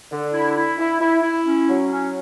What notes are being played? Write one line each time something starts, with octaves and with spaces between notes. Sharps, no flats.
D3
E4
E4
E4
E4
E4
C#4
F#3
C#4